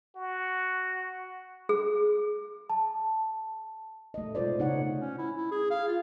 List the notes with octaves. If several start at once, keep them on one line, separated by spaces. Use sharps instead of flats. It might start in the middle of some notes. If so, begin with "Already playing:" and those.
F#4
G#4
A5
A3 D#5
B2 G#3 F4 C5 D5
C#3 A3 D#4 E4 C#5 F#5
C#4
E4
E4
G#4
F5
F4